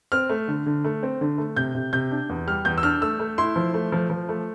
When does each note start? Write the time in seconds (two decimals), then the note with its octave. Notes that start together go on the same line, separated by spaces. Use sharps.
0.12 C4 F6
0.29 A3
0.48 D3
0.66 D3
0.84 A3
1.03 C4
1.21 D3
1.38 A3
1.56 C3 G6
1.75 C3
1.93 C3 G6
2.11 D4
2.29 E2
2.47 G3 F6
2.65 E2 G6
2.78 E6
2.83 D4 F6
3.01 A3 E6
3.20 A3
3.38 E4 C6
3.56 F3
3.74 A3
3.92 F3
4.10 F3
4.29 A3